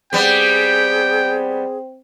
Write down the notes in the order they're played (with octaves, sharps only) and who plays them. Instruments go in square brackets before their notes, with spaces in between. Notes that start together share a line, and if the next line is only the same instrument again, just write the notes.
[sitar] G3 B3 [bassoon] C4 [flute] G#4 [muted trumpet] G5